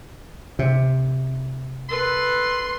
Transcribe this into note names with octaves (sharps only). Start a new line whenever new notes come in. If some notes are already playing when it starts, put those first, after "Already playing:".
C3
A4 B4 C6